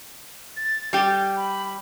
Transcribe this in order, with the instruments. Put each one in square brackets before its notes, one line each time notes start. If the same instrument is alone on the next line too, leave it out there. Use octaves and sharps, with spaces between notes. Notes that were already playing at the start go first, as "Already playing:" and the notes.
[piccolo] A6
[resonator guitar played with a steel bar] G3 G4 [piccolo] G6
[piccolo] B5